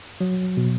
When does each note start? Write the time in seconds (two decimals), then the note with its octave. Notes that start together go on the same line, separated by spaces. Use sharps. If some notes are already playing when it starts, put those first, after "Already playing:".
0.21 F#3
0.57 B2